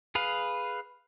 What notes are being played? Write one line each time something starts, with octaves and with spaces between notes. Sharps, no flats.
G#4 B4 F5